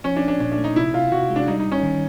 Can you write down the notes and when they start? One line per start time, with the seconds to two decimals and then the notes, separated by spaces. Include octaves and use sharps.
0.04 F3 C#4
0.17 D4
0.23 A#1
0.28 D4
0.40 A#2 D4
0.52 D4
0.58 A3
0.64 D#4
0.75 C3 E4
0.94 C3 F4
1.12 C3 F#4
1.30 G#3
1.36 D4
1.47 G3 D#4
1.59 D#4
1.66 G#1
1.72 C#4
1.83 D#3